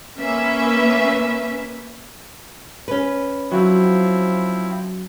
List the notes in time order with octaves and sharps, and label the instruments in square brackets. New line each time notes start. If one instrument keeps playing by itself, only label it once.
[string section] A#3 C#4 B4 E5
[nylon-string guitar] C#4 B4
[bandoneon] F3 C4 E4 [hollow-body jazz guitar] F#3